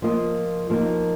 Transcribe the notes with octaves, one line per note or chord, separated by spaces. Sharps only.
F3 A#3 F4 D#5
F3 A#3 D#4